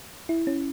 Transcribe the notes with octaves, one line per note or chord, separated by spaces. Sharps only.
E4
C#4